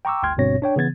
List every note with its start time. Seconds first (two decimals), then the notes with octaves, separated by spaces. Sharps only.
0.05 G5 A#5 C#6 D6 E6
0.23 G1 D2 G5 C6 F6 G#6
0.38 G1 G2 B2 C4 C#5 A#6
0.62 D4 C#5 G5
0.76 C#3 E3 B3 G#6 A6